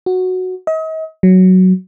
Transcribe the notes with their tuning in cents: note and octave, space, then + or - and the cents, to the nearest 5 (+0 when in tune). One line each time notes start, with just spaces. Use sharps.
F#4 -5
D#5 +40
F#3 +5